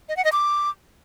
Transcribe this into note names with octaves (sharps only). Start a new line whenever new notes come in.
D#5
F#5
D#5
D6